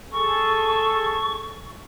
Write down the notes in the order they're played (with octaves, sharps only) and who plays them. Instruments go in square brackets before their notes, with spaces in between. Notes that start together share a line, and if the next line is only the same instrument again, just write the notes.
[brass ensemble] G#4 A4 [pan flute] C#6